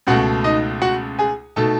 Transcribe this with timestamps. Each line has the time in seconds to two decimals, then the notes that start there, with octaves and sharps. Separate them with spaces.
0.07 C#2 B2 A3 F#4 F#5
0.44 D#4 D#5
0.82 F#4 F#5
1.19 G#4 G#5
1.56 B2 A3 D#4 A4 A5